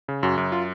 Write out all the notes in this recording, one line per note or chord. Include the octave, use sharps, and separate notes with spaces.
C#3
F#2 F#4
F#2
F4